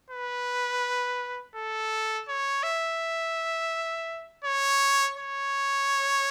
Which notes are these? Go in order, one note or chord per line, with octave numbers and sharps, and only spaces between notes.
B4
A4
C#5
E5
C#5
C#5